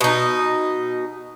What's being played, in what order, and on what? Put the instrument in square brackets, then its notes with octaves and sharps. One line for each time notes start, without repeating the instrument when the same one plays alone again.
[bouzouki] B2 D#4